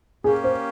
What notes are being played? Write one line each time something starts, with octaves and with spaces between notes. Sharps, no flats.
A#3 C#4 G4 G#4
C5